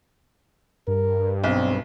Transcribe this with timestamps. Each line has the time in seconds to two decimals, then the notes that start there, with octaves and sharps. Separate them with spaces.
0.87 G2 A#4
1.44 B1 C4